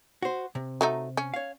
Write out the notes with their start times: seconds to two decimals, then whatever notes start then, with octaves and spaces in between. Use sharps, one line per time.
0.22 F#4 C5
0.55 C3
0.81 F#3 A3 D#4
1.17 C#4
1.34 C#5 F5